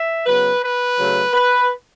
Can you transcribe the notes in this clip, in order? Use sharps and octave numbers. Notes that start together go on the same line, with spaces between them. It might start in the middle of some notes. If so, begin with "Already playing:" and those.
Already playing: E5
C#3 F#3 B3 B4
B4
C#3 F#3 A3
B4